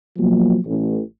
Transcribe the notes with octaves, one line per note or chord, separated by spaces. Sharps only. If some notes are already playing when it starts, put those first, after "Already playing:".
B2 F3 F#3 A#3
A1